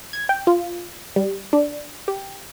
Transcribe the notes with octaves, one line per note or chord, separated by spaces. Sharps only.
G#6
G5
F4
G3
D4
G4